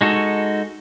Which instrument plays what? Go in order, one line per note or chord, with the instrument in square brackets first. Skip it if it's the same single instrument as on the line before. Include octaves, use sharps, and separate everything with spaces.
[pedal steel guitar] G#3 D#4 F#4 A4